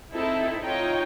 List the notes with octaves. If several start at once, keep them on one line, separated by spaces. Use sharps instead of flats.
C4 D#4 E4 A4
D#4 F4 C#5 D#5 G5